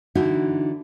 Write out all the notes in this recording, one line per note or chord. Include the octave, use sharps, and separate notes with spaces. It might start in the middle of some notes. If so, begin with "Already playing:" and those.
D3 E3 D#4 E4 F#4